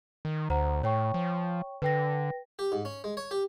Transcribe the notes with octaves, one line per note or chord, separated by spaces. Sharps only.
D#3
D2 C5 F#5 A#5
A2 C#5 G5 C#6
F3
D3 B4 G5 A#6
G4
G#2
C#4
G#3
C#5
G4